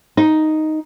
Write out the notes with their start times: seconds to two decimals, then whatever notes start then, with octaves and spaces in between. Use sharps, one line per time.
0.17 D#4